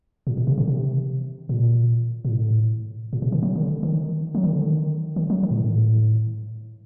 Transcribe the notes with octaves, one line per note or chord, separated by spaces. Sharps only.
A#2
A#2
C3
D3
C3
A#2
A#2
A2
A#2
C3
D#3
F#3
D#3
D3
D#3
F#3
D#3
D3
D#3
D#3
F#3
D#3
A#2
A2